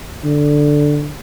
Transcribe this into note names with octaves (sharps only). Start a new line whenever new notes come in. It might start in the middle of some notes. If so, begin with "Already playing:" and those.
D3